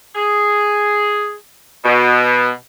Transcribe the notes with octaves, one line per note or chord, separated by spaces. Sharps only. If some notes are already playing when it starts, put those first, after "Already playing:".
G#4
B2